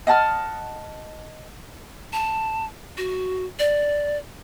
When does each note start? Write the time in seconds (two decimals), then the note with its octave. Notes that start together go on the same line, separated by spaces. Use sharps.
0.07 D#5 F#5 A5 F6
2.13 A5
2.97 F#4
3.59 D5